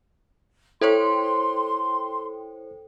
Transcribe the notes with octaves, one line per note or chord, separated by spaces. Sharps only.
E4 A4 C5 C#5 G5 C6